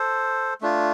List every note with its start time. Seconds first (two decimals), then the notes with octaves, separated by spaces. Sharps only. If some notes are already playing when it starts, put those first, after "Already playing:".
Already playing: A4 C5
0.61 A3 D4 F4